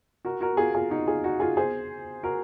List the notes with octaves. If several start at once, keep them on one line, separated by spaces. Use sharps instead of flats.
F#4 A#4
F#4 A#4
F4 G#4
F4 G#4
D#4 F#4
F4 G#4
D#4 F#4
F4 G#4
G#4 C5
F#4 A#4